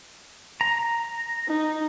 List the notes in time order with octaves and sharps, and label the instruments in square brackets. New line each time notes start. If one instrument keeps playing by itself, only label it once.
[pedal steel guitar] A#5
[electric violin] D#4